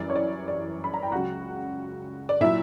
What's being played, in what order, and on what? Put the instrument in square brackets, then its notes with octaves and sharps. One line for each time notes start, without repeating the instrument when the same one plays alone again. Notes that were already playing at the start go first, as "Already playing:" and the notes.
Already playing: [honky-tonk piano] F#2 E3 G3 D5
C#5
D5
D5
B5
A#5
G5
C#2 C#3 F#3 F#4 F#5
D5
A#2 F#3 E4 E5